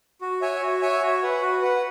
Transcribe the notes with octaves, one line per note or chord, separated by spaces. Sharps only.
F#4
C#5 E5 G#5
F#4
C#5 E5 G#5
F#4
B4 F#5
F#4
B4 F#5